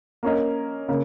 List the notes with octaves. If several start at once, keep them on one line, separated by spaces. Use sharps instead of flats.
A#3 C#4 A#4 D#5
C#3 A#3